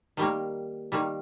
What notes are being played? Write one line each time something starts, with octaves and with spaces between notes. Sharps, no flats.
D#3 G3 A#3
D#3 G3 A#3